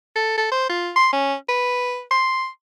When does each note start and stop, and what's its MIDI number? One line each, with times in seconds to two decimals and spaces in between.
0.16 0.34 69
0.37 0.49 69
0.52 0.67 72
0.69 0.90 65
0.96 1.09 84
1.13 1.34 61
1.49 2.02 71
2.11 2.48 84